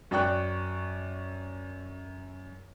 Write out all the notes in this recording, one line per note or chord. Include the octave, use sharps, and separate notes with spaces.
F#2 D5 G5 C#6 F#6